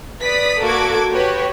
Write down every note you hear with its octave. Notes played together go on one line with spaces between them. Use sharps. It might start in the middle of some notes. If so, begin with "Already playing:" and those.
B4 D5 D#6 B6
A#3 F#4 A4 D6 G#6
F#4 G4 B4 C#5